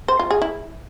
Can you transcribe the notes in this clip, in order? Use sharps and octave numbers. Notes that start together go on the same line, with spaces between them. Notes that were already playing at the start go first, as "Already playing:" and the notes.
C5
F4
G#4
E4